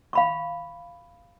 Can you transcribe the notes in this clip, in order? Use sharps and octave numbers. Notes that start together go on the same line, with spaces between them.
F5 B5 C#6